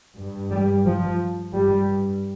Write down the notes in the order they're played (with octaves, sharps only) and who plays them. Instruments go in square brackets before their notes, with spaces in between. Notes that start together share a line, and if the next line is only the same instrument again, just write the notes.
[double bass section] G2
G3
F3
G2 G3